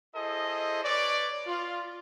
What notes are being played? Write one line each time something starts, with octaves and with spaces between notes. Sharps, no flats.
E4 G#4 A4 C5 D#5
B4 C#5 D5
F4